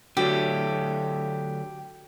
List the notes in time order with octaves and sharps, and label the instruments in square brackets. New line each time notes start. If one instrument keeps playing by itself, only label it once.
[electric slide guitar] D3 F#3 A3 [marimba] F#4 [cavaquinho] G4